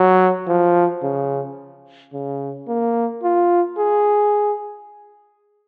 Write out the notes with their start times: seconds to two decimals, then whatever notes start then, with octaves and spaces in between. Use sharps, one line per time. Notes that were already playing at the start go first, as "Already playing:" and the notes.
Already playing: F#3
0.48 F3
1.03 C#3
2.13 C#3
2.68 A#3
3.23 F4
3.78 G#4